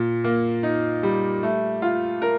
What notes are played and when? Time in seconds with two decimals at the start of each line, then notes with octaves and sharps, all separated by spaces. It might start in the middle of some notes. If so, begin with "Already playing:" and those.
Already playing: A#2
0.24 A#3
0.63 D#4
1.03 G3
1.43 A3
1.82 F4
2.22 A#4